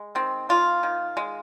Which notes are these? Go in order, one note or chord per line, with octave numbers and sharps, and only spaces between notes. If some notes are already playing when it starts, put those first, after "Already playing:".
Already playing: G#3
D#3 C4
A#3 F4
D#3
G#3